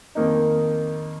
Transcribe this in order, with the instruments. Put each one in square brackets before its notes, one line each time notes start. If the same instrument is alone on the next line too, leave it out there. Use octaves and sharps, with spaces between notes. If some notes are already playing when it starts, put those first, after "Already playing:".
[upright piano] F2 D#3 A#3 D#4